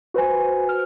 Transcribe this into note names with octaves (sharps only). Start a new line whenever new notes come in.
F#4 B4 C5 G#5
F6